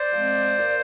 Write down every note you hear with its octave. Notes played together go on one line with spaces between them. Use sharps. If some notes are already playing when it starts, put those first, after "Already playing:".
Already playing: C5 D5
F3 G#3 C4
A#2